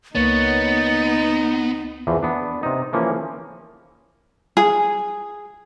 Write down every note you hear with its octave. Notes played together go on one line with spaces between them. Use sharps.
C#2 A#3 B3 D#4 C#5 A6
E2 E3 F3
B3 D4
C3 D#4
E3 F3 A#3 C#4
G#4